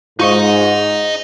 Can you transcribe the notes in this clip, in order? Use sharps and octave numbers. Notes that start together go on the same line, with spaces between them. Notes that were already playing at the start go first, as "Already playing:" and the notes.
G#2 D#4 F4 D#5 C#6